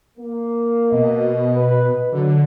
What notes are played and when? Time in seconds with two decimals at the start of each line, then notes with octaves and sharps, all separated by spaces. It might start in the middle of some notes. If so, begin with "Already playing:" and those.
0.18 A#3
0.92 B2 D#5
1.55 B4
2.12 D3 F#3